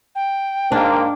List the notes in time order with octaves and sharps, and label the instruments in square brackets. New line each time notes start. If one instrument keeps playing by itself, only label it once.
[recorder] G5
[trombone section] G#2 A#3 [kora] D4